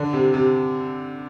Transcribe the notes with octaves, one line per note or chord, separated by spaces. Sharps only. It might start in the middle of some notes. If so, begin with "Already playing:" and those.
Already playing: D3
C3
C3